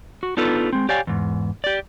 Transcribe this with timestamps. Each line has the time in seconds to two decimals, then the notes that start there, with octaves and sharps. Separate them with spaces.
0.23 F#4
0.37 B3 D4 D#4 F4 A4 B4
0.73 G#3 C4
0.89 G4 C#5 D5 F5 G#5
1.07 E2 G#2
1.64 G4 D5